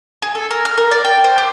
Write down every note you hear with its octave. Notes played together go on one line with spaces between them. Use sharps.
G#4
A4
A#4
F6
A#4
D5
G5
C5
G4